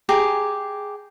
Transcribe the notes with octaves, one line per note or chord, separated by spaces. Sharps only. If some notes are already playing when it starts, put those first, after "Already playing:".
G4 G#4 A#5